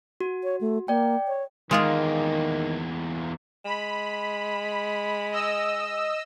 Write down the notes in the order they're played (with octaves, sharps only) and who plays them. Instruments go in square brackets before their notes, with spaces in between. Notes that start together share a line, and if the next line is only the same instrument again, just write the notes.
[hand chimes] F#4
[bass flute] C#5
A3
[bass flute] A#3 [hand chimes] D5 G5
[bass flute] C#5
[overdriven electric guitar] E2 A#3 [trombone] D#3 [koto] G#3 F4 G#4
[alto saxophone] G#3 [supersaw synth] B5
[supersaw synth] D#5 E6